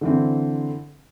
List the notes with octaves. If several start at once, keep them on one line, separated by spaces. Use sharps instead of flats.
D3 E3 C4